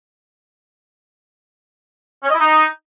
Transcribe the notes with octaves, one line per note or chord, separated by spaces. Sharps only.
C#4
D#5
E4
D#4